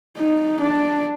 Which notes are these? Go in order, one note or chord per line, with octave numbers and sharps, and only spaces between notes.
D#4
D4